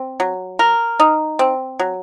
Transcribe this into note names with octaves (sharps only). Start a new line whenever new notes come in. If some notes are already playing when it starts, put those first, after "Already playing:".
Already playing: C4
F#3
A#4
D#4
C4
F#3